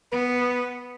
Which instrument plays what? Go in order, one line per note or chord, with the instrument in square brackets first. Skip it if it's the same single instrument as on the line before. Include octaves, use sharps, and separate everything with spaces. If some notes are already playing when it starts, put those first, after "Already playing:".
[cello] B3 [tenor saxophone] B4